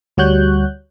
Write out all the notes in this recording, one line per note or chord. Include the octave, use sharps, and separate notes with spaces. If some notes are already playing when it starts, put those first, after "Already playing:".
D2 G3 F#4 C#5 F#6 G6